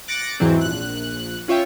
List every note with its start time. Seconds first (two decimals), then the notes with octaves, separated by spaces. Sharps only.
0.08 D6 F#6 A6 A#6 C#7 D7
0.40 E2 G#2 E3 F#3 C4
0.61 A#1 F#6
1.48 C#4 F4 C#5 E5 G5